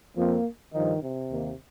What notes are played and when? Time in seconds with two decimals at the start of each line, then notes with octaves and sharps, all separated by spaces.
0.16 F2 F3 A#3 C4 F4
0.73 G2 D#3 F3 D#4
1.02 C3
1.30 D#2 D#3 A#3